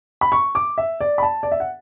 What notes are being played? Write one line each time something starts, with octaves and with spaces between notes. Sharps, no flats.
B5
C#6
D6
E5
D5
B5
A5
D5
E5
F#5